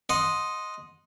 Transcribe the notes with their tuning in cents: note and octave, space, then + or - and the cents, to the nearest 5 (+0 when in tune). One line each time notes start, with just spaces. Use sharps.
D#5 +0 F#5 -25 C6 +0